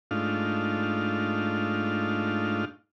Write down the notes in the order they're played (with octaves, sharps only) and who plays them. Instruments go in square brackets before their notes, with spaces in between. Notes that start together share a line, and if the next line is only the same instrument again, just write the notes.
[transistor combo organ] G#2 A3 D4 D#4 F4 F5